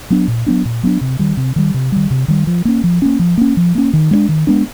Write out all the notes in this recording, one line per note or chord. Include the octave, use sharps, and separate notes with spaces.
F#3 B3 D4
A#2
F#3 B3 D4
A#2
F#3 B3 D4
C3
D#3 G3
C3
D#3 G3
C3
D#3 G3
C3
D#3 G3
F3
A#3 C#4
F3
A#3 C#4
F3
A#3 C#4
F3
A#3 C#4
D#3
G#3 B3 D4
D#3
G#3 B3 D4